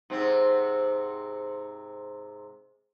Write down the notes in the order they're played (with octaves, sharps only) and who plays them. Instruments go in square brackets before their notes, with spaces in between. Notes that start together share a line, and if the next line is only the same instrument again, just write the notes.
[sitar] G#2 C3 C4